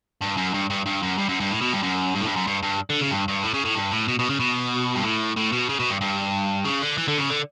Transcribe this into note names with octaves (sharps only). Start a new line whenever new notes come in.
G2
F#2
G2
G2
G2
F#2
G2
F#2
G2
A2
B2
G2
F#2
G2
A2
G2
F#2
G2
G2
D3
C#3
G2
G2
A2
C#3
A2
G2
A2
B2
B2
C#3
B2
G2
A2
A2
B2
C#3
B2
G2
G2
C#3
D3
E3
D3
C#3
D3